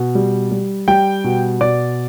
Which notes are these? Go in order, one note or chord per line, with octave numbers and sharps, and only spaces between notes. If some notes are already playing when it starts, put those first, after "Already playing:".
Already playing: B2
G3
G3
G3 G5
B2
B2 D5